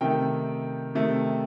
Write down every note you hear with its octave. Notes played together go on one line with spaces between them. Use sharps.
C3 D#3 A3 G5
C3 D#3 A3